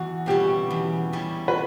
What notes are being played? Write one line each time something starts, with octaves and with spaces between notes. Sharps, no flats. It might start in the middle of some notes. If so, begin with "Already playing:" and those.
Already playing: E2 F#4
B2 G3 C#4 E4 G4
E2
B2 G3 C#4 E4
B4